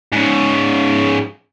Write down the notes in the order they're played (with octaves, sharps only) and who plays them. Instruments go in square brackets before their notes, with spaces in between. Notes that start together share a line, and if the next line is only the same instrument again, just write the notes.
[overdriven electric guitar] G#2 C#3